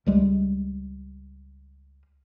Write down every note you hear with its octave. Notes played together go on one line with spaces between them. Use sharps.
C#2 G3 G#3